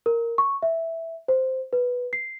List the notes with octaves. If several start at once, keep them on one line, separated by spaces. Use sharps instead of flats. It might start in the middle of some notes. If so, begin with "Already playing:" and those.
A#4
C#6
E5
C5
B4
C7